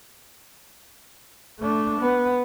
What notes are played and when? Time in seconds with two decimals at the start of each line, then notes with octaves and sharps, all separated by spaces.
1.59 A3 D4
2.00 B3